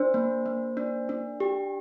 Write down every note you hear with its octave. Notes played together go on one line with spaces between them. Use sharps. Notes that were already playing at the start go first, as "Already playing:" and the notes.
Already playing: D4 C5
A#3
A#3
D4
D4
G4